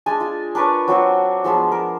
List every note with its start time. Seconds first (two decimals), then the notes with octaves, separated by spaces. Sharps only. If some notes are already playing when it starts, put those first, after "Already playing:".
0.06 G#3 D4 G#5 A5
0.20 F4
0.55 D4 A#4 B4 C#5
0.88 F#3 C4 F#4
1.44 F3 G#3 B3 C6
1.72 A#4